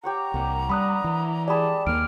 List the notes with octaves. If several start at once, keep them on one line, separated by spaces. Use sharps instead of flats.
G4 C#5 F#5 A#5
C2 A#3 F#5
G3 D4 F#5 B5 D#6 F#6
E3
G#3 G4 G#4 D5 A5 B5
D#2 A#3 F6 D7